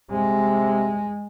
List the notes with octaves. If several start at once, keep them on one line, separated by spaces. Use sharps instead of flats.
C3 G#3